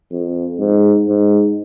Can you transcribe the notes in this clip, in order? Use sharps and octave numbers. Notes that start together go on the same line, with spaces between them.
F2
G#2
G#2